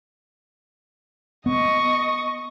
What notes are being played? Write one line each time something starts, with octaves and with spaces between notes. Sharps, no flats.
B3 D#5 C#6